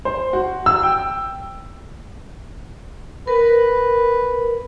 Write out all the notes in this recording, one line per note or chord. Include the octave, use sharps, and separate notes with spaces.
C5
F#4
E6
G5
A#4 B4